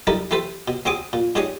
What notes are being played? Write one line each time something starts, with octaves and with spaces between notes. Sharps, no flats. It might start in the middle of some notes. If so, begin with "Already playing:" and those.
G3 D#4 E4 G4 A4 A#4
E3 A3 G4 A4 B4 C5
B2
D2 C4 F#4 G#4 D6 D#6
A#2
G#2 D4 G4 G#4 C#5 D#5